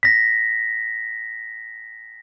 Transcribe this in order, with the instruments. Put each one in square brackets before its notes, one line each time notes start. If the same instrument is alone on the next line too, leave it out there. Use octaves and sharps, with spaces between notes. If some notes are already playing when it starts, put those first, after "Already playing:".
[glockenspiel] A#6 B6